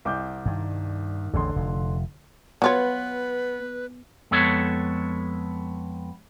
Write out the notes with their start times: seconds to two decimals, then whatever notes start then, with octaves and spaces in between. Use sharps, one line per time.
0.05 C2 D6 G6
0.46 G2 D#3
1.34 A1 E2 D3 C6
1.56 F1
2.62 F#3 B3 F4 B4 C#5
4.31 F2 G#3 B3 A4 C#5